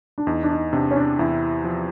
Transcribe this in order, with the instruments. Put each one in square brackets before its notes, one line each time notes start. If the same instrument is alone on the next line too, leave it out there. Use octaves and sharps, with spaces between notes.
[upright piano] D4
[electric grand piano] E2 [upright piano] D#4
[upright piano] D4
D#4
[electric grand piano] C3 [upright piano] D4
[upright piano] C#4
D4
[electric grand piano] E2 [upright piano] E4
[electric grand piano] F3